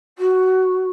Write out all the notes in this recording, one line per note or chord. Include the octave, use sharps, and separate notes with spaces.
F#4